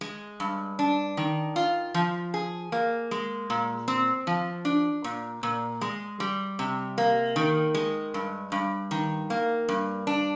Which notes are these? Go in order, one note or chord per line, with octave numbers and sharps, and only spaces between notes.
G#3
G2
D4
D#3
F4
F3
G#4
A#3
G#3
A#2
C4
F3
D4
A#2
A#2
G#3
G3
C3
A#3
D#3
G#3
G2
G2
D#3
A#3
G2
D4